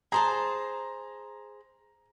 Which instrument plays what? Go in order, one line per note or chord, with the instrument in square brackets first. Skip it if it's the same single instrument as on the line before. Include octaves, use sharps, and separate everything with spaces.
[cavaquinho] G#4 C5 A5 [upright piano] A#5